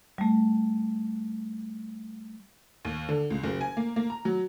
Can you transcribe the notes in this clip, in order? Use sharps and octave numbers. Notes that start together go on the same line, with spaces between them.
G3 A3
D#2
D3
C#2
F#1
G#5
A#3
A#3
A#5
F#3